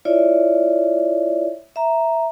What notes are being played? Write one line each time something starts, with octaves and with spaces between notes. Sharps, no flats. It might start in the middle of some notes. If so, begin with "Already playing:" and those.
E4 F4 C#5 D5 E5
E5 A#5